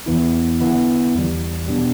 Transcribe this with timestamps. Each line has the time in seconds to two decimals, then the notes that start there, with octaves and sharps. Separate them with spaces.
0.06 E2 E3 B3 E4
0.60 D3 B3 E4
1.15 E2 E3 G3
1.68 B2 G3 B3 D4